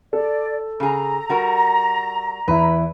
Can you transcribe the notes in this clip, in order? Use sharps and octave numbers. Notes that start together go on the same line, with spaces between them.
A4 D5
C#3 G#4 A#5
G3 F#4 A#4
E2 E4 B4